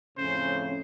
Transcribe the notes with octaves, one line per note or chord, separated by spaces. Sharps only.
F2 A2 C#3 C#4 C5